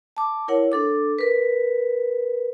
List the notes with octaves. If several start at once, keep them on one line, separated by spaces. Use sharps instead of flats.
A5 D6
E4 A#4 C#5 F#5
D4 A4 D6
A#4 B4